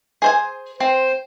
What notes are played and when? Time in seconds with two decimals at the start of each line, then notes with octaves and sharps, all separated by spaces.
0.22 G#4 C5 G#5
0.80 C4 C5